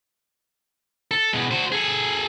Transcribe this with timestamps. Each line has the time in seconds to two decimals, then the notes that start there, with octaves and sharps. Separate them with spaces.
1.11 A4
1.33 B2 G#3
1.51 F#4 C5
1.72 G#4 A4